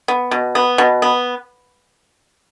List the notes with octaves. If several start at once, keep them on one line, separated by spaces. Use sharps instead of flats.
B3
B2
B3
B2
B3